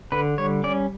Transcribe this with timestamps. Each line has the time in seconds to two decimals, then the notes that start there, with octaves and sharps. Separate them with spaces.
0.12 D3 B4
0.38 G3 C#5
0.64 C#4 D5